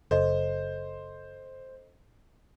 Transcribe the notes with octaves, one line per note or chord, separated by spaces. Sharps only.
F#1 A4 C5 D#5